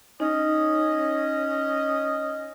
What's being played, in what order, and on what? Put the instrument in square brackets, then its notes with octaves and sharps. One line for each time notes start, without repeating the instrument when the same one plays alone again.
[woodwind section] C#4 D#5 [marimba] D#4